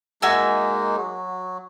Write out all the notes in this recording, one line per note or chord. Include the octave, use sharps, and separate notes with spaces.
G#3 A#3 D#4 F#4 E5 G#5
F#3